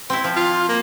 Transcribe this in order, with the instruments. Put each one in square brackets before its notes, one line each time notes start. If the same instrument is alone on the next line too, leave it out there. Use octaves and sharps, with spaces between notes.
[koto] C4 E4
F3
[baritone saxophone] F4
A#3